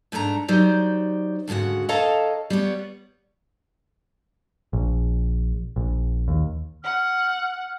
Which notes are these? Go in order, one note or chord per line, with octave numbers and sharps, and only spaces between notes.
G#2 A3 D4 A#4 A#5
F#3 D#4 G4 C5 D5
D2 G#2 C#3 F#4 F#5
A4 C#5 D#5 F5 A5 A#5
G3 B3 C#5
A#1
A#1
D#2
F#5 F6